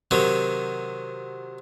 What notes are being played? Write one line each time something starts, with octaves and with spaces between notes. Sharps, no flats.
C3 D#3 F#3